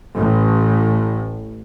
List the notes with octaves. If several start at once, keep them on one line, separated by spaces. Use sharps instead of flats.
A1 A2